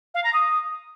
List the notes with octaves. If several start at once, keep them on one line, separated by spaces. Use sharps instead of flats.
F5
A#5
D#6